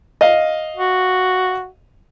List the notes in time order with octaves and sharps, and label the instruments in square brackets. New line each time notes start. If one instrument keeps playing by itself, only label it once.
[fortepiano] D#5 F5
[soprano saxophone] F#4